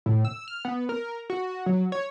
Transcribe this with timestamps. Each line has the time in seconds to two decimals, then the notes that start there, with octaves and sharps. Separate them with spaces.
0.06 A2
0.25 E6
0.48 F6
0.65 B3
0.89 A#4
1.30 F#4
1.66 F#3
1.92 C#5